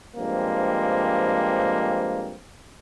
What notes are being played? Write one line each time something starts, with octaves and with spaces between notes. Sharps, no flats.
G2 F3 G#3 A#3 C4